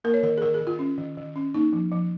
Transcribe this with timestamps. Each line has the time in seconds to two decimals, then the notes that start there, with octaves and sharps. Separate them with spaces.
0.04 A#3 A#4
0.14 C#5
0.23 D#3 A#4
0.38 G#4
0.42 D#3 A#4
0.54 G#4
0.60 D#3
0.67 F4
0.79 C#4
0.98 D#3
1.17 D#3
1.36 C#4
1.54 A#3 D#4
1.73 F3
1.92 F3